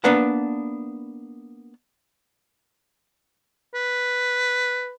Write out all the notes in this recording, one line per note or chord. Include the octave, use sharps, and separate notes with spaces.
A#3 B3 D4 B4 F#5 A5
B4